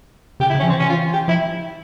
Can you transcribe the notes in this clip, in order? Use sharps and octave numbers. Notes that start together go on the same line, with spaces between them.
C#3 G4
E4
C#3 C#4
F3
E3 C4
C#4
F4
G4
F3 E4